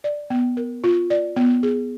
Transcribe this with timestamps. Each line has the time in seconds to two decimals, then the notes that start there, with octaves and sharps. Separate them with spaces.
0.04 D5
0.30 B3
0.57 A#4
0.84 F4
1.10 D5
1.36 B3
1.63 G#4